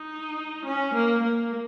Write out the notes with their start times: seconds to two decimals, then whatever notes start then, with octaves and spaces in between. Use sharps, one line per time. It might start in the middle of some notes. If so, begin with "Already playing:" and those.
Already playing: D#4
0.65 C#4
0.94 A#3
1.23 A#3